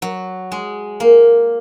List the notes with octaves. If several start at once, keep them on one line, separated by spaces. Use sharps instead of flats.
F#3
G#3
A#3